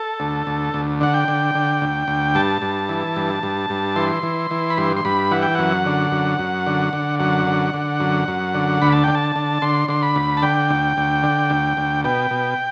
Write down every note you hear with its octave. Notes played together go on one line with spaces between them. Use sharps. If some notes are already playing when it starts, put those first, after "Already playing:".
Already playing: A4
D2
D2
D2
D3 F#5
G5
D3
D3
D2
D2
G2 A5
G2
E3
G2
G2
G2
E3 C6
E3
E3
B5
G2 C6
C6
G2 B5
E3 F#5
G5
F#2 F#5
D3
F#2
F#2
D3
D3
F#2 F#5
D3
D3
F#2
F#2
D3
D2 B5
A5
D3 G5
A5
D3
D3 C6
D3 C6
B5
D2
A5
D3 G5
D2
D2
D3
D2
D2
B2 G5
B2